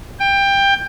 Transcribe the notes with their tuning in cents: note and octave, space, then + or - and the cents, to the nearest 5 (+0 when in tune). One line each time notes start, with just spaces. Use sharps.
G5 +20